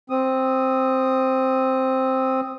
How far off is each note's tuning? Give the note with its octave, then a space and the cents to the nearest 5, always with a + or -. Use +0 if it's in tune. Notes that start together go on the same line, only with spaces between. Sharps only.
C4 +5 D#6 +0